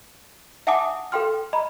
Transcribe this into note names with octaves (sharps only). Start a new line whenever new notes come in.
E5 F#5 G#5 A5 D6 D#6
A4 F5 G5 C6 F6
D#5 A#5 B5